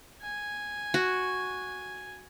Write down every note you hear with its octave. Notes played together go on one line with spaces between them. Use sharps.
G#5
F#4